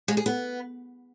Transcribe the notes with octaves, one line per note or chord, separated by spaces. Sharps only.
G#3
G#4
B3